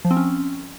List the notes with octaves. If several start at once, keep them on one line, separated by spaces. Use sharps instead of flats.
F3
C4
C#4